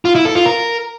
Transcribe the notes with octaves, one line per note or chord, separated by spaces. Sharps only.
F4
E4
A4
F4
A#4